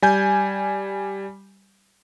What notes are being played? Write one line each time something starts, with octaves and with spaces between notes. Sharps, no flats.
G3 G#5 G6